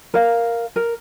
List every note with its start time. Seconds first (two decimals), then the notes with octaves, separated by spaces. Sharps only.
0.14 A#4 F5
0.76 A#4